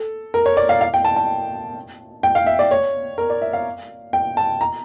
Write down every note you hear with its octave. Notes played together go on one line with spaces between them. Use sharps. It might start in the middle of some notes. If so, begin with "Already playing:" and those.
Already playing: A4
A#4
C#5
D5
F5
F5
G5
A5
A5
G5
F5
E5
D5
C#5
A#4
D5
E5
F5
G5
A5
A#5